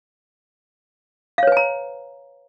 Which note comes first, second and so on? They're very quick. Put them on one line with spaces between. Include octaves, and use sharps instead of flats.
F5 C#5 B4 G#5 A#5